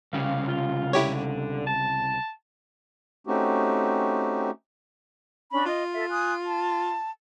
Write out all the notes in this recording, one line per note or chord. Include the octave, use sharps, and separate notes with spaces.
C2 C#3 C4 G4 F5
F4
D3 E4 G4 C#5
A5
A3 C4 C#4 D#4 F#4 G4
C#4 D4 B5
F4 D#5
A4 E5
G#5 D#6 F#6
A5